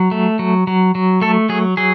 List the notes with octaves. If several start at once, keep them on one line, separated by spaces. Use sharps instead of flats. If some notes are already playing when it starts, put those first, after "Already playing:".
Already playing: F#3
A3
F#3
F#3
F#3
A3 A4
F#3 G#4
F#3 G#4